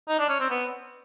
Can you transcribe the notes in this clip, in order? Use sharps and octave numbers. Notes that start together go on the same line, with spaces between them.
D#4
D4
C#4
C4
B3